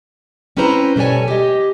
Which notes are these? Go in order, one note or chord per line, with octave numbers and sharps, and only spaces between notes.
C4 C#4 E4 B4 C5 A#5
B2 G3 A4 C#5 G#5
G4 D#5